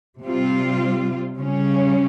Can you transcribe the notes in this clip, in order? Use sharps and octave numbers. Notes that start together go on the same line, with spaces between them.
C3 G3 C4 F4
C#3 G3 C#4